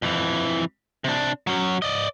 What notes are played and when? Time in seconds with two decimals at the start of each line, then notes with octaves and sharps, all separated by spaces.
0.02 F2 E3
1.04 C3 D4
1.47 F#3 C#4
1.82 D5 D#5